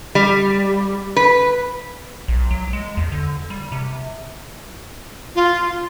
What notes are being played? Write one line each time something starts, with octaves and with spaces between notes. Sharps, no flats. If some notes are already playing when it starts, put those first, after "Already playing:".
G3
B4
B1
F#3
G#3
E2
D3
G3
C3
F4